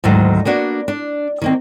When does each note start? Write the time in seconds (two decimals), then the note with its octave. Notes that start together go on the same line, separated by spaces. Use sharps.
0.04 D2 G#2 D#3 F#3
0.45 A#3 B3 D4 F#4
0.88 D4
1.41 D#3 A#3 C4